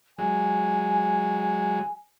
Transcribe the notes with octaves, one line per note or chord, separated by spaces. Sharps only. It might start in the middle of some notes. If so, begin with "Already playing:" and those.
F#3 G#3 G#5